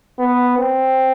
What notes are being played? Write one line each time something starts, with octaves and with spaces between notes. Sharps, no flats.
B3
C4